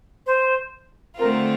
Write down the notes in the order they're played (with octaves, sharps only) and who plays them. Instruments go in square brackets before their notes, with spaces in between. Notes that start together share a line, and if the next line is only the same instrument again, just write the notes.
[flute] C5
[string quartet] D3 A3 C4 F4 [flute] A#4